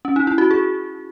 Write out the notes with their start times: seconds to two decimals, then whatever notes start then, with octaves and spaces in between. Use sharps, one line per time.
0.05 C#4
0.16 D#4
0.27 E4
0.38 F#4
0.51 G#4